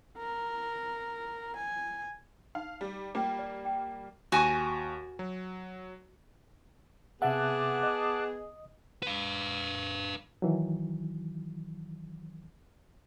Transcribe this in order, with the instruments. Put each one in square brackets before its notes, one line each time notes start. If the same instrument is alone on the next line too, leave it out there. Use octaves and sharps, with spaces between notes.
[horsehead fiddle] A#4
G#5
[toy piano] D#4 [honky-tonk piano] F5
[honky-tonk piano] G3
[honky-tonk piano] G3 A#3 [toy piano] F4 B4 G5
[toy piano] D5
G5
[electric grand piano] D#2 C#6 [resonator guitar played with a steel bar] F#4 G#5
[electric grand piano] F#3
[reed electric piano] C3 E5 [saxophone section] B3 G#4 [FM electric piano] F#5 [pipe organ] A5 D6 F#6
[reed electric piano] D#5 D#6
[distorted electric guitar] B4 F5
[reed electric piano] D#3 E3 F#3